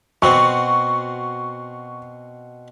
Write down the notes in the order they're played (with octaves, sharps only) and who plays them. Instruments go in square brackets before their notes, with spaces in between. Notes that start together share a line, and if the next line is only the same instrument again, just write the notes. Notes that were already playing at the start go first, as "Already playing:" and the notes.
[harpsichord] B2 C4 F#4 [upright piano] C#6